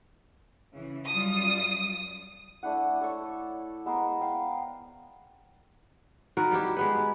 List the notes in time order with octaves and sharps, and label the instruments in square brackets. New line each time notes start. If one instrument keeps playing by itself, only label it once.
[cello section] C#3 E3
[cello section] F#2 G3 F4 [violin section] D#6
[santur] A3 D4 E4 F#5
A4 C#5 D5 C#6
G#3 B3 A#4 C5
F5 G5
[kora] D#3 F#4 A#4 B4
G3 B3 E4 G4
G#3 B3 B4